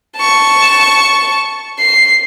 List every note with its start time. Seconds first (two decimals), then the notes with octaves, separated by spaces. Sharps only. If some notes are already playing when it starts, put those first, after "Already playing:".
0.17 A5 C#6
1.79 C7